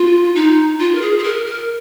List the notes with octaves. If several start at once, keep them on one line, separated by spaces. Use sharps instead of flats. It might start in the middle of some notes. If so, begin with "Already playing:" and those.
Already playing: F4
D#4
F4
A#4
G#4
G#4
A#4
A#4